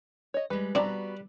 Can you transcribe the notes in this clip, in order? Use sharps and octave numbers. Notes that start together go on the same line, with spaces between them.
C#5 D#5
G3 G#3 B4
G3 B3 C4 D4 F#4 B4 D5 A#5